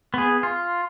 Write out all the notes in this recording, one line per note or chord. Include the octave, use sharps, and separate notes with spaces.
B3 G#4
F4